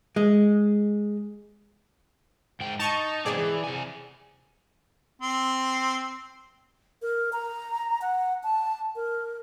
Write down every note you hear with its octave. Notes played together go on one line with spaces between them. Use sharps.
G#3
G#2 G5
D#4 A5 C#6
G#2 B2 C4 G#4 D5
E3
C3 G#5
C4
A#4
A#5
F#5
A5
A#4